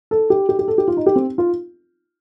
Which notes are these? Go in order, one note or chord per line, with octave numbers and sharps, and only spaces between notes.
A4
G4
G4
G4
A4
G4
F4
D#4
G4
C4
F4